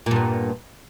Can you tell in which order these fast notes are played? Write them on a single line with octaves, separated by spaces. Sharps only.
A#2 G2 B3